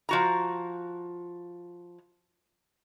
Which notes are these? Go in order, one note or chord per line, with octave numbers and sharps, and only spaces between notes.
F3 F#4 A#5